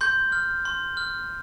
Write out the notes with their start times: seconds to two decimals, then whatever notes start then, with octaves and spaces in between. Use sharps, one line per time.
0.01 C6 G6
0.32 F6
0.65 C6
0.97 F6